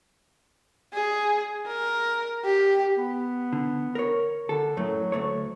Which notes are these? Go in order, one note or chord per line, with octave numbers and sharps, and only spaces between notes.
G#4
A#4
G4
B3
D3
A#4 C#5
D3 A4
F#2 A2 F#3 A3
D2 A3 C#5